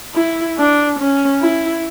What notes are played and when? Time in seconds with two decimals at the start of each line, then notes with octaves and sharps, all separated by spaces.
0.15 E4
0.58 D4
0.99 C#4
1.41 E4